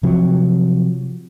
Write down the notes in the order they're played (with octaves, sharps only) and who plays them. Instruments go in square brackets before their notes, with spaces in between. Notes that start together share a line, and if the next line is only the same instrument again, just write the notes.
[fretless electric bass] C3 F3 F#3